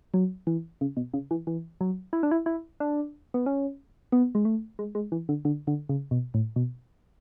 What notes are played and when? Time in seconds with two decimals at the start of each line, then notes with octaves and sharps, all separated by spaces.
0.14 F#3
0.47 E3
0.81 C#3
0.97 B2
1.14 C#3
1.31 E3
1.47 E3
1.81 F#3
2.13 E4
2.23 D4
2.31 E4
2.46 E4
2.80 D4
3.34 B3
3.46 C#4
4.12 B3
4.35 G#3
4.45 A3
4.79 G#3
4.95 G#3
5.12 E3
5.29 D3
5.45 D3
5.67 D3
5.89 C#3
6.11 B2
6.34 A2
6.56 B2